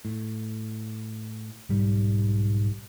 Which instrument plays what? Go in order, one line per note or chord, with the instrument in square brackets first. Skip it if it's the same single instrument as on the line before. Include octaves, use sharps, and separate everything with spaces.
[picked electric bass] A2
[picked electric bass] B1 G3 [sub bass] G#2